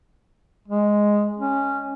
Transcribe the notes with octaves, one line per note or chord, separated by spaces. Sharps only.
G#3
C#4